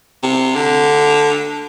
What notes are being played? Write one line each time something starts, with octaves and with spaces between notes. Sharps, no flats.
C3
D3